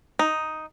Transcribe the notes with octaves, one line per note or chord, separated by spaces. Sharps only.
D#4